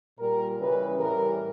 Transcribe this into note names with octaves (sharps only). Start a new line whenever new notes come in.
A#2 G3 A#4
C#3 E3 G3 B4
A2 E3 G3 A#4